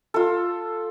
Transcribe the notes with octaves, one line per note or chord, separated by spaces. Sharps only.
F4 A4